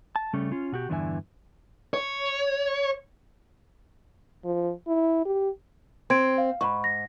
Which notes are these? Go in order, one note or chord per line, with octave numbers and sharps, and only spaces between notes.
A5
C#3 G3 A3 C#4
C#4 F4
B2 F#4 G4
E2 G2 D3 E3 E5 G#5
C#5
F3
E4
G4
C4 C6 G#6 D7
F5
G#2 B5 C#6
A#6